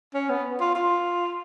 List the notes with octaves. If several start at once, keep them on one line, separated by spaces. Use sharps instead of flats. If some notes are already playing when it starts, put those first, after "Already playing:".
C#4
B3
F4
F4